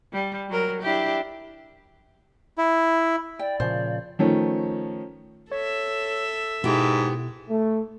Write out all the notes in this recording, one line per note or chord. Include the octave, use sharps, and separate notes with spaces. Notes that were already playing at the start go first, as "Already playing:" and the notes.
G3
F#3 A#4
D4 E4 G4
E4
D5 G5
A#2 C#3 F3 C5
D#3 F3 A3 C#4
A4 C#5 E5
G#2 B2 B3 E4 G4
A3